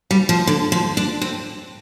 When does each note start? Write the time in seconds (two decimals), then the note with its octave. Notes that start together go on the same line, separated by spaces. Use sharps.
0.11 G3
0.29 F3
0.47 D3
0.72 F3
0.97 D4
1.21 C4